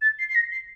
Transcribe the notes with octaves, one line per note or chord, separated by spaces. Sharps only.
A6
C7
C7
A#6
C7